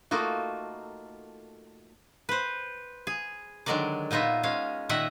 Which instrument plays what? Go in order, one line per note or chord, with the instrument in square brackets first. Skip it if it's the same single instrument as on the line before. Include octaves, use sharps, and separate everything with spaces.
[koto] A3 A#3 D#4 F4 F#4
B4 C5
G#4
D3 D#3 F#3 G#3 A#4 D5
A#2 B3 D#4 F4 E5
G#3 C#4 F5
A#2 D#3 D#5 E5 F#5